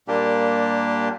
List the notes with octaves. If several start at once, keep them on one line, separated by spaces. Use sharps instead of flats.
A#2 G3 A#3 D4 G4